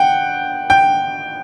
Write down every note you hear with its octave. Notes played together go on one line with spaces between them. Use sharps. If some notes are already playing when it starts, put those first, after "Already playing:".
Already playing: F#5 G5
G5